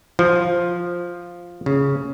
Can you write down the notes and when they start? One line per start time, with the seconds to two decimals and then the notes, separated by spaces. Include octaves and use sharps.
0.19 F3
1.66 C#3